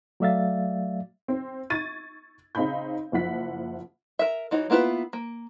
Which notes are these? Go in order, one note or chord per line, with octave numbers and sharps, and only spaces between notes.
F#3 A3 D5 E5 F5 A6
C4
C#6 G#6 A6 D#7
C#3 C4 D#4 F5 B5 G6
F#1 F3 E4 F#5 B6
A#4 E5
E3 D#4 F#4 C#5
A#3 B3 E4 F4 B4
A#3